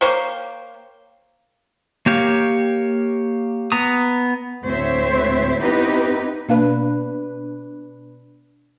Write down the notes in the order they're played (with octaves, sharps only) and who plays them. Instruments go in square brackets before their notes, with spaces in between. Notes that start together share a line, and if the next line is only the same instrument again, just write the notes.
[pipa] A#3 C5 C#5 G5
[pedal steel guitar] A#3 G4 C#5 F5
B3 A#5 D#6
[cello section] D2 A2 C4 C5 C#5 E5
B3 C4 D#4 E4 G4 B4
[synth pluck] B2 D4 B4 [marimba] A#3 F5